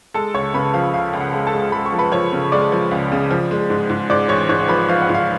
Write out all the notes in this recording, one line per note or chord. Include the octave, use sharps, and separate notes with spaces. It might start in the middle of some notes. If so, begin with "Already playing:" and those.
G#3 A4 A5
C#2 C#5 C#6
C#3 B4 B5
F3 F5
C#2 F5
C#2
F#5
G#3
A4 A5
G#3
G#3 B5
C#6
F3
B4 B5
F3 C#5 C#6
C#3
G#3 D5 D6
F3
C#2
C#3
F3
G#3
G#2
G#2
G#2 D5 D6
A1 C#5 C#6
G#2 C#5 C#6
F3 B4 B5
F3 F5
F#5
G#2
F5